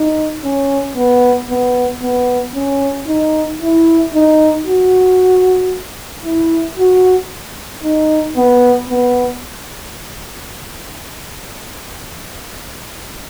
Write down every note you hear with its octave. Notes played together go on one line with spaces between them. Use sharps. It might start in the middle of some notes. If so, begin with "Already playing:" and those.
Already playing: D#4
C#4
B3
B3
B3
C#4
D#4
E4
D#4
F#4
E4
F#4
D#4
B3
B3